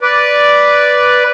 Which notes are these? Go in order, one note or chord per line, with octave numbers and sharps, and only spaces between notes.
B4 D5